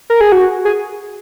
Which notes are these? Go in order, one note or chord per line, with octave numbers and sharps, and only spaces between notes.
A#4
G#4
F#4
G#4